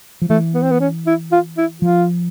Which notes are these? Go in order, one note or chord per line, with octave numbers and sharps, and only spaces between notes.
F3
E3 A3
B3
C4
B3
C#4
E4
F4
E4
F3 F4